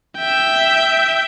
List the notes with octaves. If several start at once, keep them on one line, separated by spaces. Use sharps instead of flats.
E5 G5